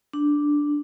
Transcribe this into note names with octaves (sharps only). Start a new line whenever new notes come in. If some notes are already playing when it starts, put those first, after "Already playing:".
D4